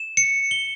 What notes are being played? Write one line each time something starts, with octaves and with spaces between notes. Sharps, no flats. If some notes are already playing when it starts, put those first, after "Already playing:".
Already playing: E7
C#7
G7